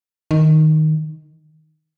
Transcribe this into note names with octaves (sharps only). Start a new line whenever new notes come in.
D#3